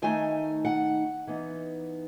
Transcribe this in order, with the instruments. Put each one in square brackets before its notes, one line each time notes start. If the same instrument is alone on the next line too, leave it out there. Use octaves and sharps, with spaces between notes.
[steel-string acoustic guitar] D#3 A3 D#4 G#5
F#5
E3 B3 D#4